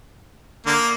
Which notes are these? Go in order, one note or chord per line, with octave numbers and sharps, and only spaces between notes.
D3 A#3